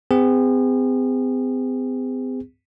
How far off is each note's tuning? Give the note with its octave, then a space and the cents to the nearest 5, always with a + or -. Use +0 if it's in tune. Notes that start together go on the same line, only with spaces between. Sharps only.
C4 -45 G#4 -35